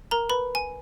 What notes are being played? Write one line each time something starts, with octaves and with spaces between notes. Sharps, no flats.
A#4 A#5
B4 B5
G#5